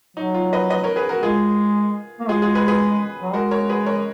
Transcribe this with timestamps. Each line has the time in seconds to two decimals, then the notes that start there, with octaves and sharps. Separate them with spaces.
0.17 F#3 D#4
0.34 F4
0.53 B4 D#5
0.70 B4 D#5
0.84 A#4 C#5
0.96 G#4 B4
1.09 F#4 A#4
1.23 G#3 F4 G#4
2.20 A#3
2.29 G#3 F4 G#4
2.42 F4 G#4
2.55 G#4 B4
2.68 G#4 B4
3.22 F#3
3.34 G#3 F#4 A#4
3.51 A#4 C#5
3.69 G#4 B4
3.86 A#4 C#5